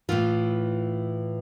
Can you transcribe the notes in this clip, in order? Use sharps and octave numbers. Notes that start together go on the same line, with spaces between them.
A2 E3 F4